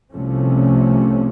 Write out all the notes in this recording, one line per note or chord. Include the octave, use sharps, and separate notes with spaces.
C2 C3 F3 A3 C#4